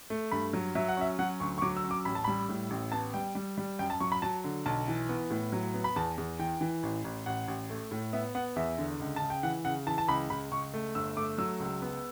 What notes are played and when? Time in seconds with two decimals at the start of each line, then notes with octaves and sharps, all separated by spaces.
0.10 A3
0.32 G2 B5
0.53 F#3
0.75 F#3 E5
0.88 F#5
0.97 C#4 E5
1.19 F#3 F#5
1.40 D2 C#6
1.58 C#6
1.62 F#3 D6
1.77 E6
1.84 C#4
1.91 D6
2.05 A1 B5
2.15 A5
2.24 G3 B5
2.49 A2
2.70 A1
2.92 B3 A5
3.14 G3 G5
3.35 G3
3.58 G3
3.79 F#2 G5
3.90 A5
4.00 F#3 C#6
4.12 B5
4.22 F#3 A5
4.44 D3
4.66 B1 A5
4.88 E3
5.09 B3
5.30 A2
5.53 F#3
5.74 B3
5.84 B5
5.96 E2 A5
6.18 E2
6.39 E3 G5
6.61 E3
6.83 A1
7.05 A1
7.26 A1 F#5
7.48 A1
7.70 A3
7.91 A2
8.13 B3 E5
8.35 B3 F#5
8.56 E2 E5
8.78 D3
9.00 C#2
9.16 A5
9.22 C#3
9.30 G5
9.43 E3 F#5
9.65 C#3 F#5
9.86 E3 A5
9.98 A5
10.08 C#2 B5
10.30 C#2 B5
10.51 C#2 C#6
10.74 A3
10.95 G1 E6
11.17 A3 D6
11.38 F#3 E6
11.60 C#2
11.82 B3